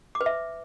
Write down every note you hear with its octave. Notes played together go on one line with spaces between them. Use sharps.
D6
B4
E5